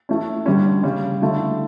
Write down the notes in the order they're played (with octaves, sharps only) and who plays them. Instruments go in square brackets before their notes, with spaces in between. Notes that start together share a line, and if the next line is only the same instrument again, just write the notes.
[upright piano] E3 A3 C#4
G2 D3 G3 C#4
C#3 G3 C#4
D3 A3 E4